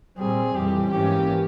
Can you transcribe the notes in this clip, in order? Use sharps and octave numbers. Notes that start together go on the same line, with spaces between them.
A#2 G3 C4 G#4
F2 E3 G3 G4
G#2 E3 A#3 C#4 G4